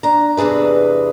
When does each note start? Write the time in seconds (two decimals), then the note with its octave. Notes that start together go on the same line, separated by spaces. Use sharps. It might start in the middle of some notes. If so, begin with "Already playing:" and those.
0.03 D4 A#5
0.37 E2 C3 D4 G#4 B4